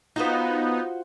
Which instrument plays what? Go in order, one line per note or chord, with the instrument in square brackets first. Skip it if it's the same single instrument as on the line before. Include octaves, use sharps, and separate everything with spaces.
[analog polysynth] B3 D#4 [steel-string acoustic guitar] F4 F#4 C5